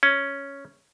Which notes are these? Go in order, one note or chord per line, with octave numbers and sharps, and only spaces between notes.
C#4